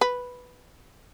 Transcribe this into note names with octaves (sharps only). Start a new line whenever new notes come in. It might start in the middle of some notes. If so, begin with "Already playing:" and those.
B4